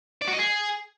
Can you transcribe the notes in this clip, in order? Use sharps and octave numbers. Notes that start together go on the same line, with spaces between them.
D5
F#4
D#5
G#4